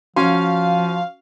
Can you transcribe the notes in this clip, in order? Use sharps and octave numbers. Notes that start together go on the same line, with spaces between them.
F3 C#4 F#4 F5 C6